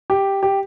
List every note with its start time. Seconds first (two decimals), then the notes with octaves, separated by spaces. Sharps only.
0.10 G4
0.43 G4